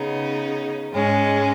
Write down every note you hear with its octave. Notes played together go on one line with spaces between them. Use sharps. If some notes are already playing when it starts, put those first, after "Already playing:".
Already playing: C#3 B3 D#4
G#2 G#3 C#4